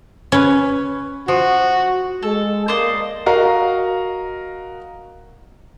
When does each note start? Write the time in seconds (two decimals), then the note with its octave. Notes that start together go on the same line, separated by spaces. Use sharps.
0.32 C#4 B4
1.28 F3 F#4
2.23 G#3 A4
2.68 A#3 C5 D5 D#5
3.26 F#4 A#4 D#5 F5 A#5